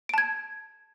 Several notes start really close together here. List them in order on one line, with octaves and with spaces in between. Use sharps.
D7 A5 G#6